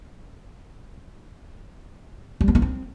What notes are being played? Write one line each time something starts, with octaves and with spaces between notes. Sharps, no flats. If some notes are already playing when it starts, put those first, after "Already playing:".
G3
B3
A#3
C4